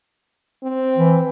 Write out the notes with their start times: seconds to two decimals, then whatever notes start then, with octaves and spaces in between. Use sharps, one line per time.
0.63 C4
0.97 E3